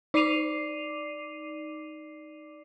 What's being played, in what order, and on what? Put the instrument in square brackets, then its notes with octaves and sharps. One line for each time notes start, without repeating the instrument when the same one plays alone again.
[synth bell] D#4 D5 D6 C7 D#7 F7